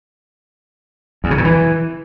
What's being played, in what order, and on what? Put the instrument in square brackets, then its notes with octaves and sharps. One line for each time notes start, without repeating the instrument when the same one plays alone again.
[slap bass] E2
C#3
A#2
E3